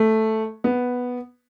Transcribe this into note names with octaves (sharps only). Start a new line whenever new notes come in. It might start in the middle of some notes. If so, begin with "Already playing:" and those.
Already playing: A3
B3